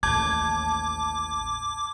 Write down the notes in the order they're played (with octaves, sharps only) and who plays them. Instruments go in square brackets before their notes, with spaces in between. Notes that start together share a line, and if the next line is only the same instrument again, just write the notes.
[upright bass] A1 D#2 [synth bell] A5 G#6 [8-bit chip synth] D6